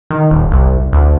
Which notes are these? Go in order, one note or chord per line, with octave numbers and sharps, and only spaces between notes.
D#3
D#1
C2
D2